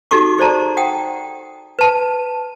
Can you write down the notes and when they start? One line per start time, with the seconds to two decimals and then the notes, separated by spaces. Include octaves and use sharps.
0.11 D#4 F#4 G4 A4 C#6 D6
0.38 G#4 C5 D5 A5 A#5
0.77 F#5 G5 D#6
1.79 B4 A5